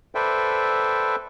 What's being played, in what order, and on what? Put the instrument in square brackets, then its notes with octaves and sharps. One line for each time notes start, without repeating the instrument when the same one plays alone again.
[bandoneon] A4 B4 C5 D5 E5 G5